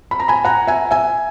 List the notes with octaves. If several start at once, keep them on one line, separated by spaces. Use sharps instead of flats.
B5
A#5
G#5 B5
F#5 A#5
E5 G#5
E5 G#5